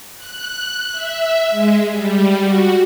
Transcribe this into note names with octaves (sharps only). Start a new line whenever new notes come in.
F#6
E5
G#3
G3
F#4